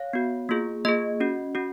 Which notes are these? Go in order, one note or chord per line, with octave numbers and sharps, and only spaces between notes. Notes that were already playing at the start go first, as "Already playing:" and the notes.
Already playing: C#5 F5
B3 F#4
A#3 F4 G#4
A#3 F4 G#4 D#5
C#4 F#4
C#4 F#4